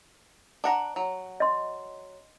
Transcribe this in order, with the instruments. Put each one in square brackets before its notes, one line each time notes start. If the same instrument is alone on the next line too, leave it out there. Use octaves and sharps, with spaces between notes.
[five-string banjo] D4 F#5 A#5
F#3
[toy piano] D#5 C6